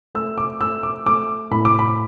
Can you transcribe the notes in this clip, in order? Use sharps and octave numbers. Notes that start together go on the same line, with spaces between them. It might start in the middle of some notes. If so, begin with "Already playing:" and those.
A3 E6
D6
A3 E6
D6
A3 D6
A2 B5
D6
B5